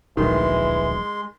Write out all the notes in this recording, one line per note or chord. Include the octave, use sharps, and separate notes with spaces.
D1 A#1 D#3 E3 F#3 G#3 C6